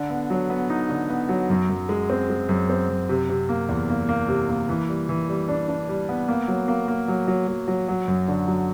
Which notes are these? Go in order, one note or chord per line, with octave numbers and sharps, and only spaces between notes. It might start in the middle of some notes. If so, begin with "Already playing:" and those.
Already playing: D3
B3
F#3
B3
D#4
D3
B3
F#3
F#2
F#2
G#3
C4
G#3
F#2
C4
F#2
C3
C3
A#3
E2
A#3
A#3
C3
A#3
E3
G3
E3
G3
D4
D4
G3
B3
A#3
F#3
A#3
A#3
F#3
F#3
F#3
F#3
F#3
F#2
D3
F#3